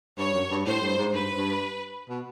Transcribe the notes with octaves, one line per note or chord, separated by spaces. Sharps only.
G2 C#5
F#2
G2
A2 C5
G2
G#2
G2 B4
G2
B2